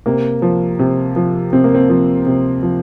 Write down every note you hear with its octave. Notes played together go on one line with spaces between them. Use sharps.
C3 A#3
F3
C3
F3
C3 C4
A#3
C4
F3
C3
F3